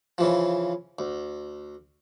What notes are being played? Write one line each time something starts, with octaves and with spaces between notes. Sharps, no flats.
C#3 E3 F3
D2